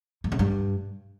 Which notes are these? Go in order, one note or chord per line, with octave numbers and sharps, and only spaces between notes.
G2
C#3
G2